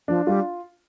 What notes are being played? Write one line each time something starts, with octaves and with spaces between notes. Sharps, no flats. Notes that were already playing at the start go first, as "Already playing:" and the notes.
F3 D4
G3 F4